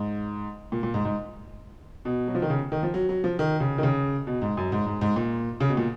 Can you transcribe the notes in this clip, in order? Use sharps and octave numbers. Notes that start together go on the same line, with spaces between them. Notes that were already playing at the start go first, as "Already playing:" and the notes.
Already playing: G#2
A#2
A#2
G#2
G#2
B2
F#3
F3
D#3
C#3
D#3
F3
F#3
F#3
F3
D#3
C#3
D#3
C#3
B2
G#2
F#2
G#2
G#2
G#2
A#2
C#3
B2
A#2